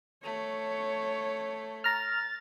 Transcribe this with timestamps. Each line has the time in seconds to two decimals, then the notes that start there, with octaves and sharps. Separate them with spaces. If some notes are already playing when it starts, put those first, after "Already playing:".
0.23 A3 C#5
1.84 A#5 F6 A6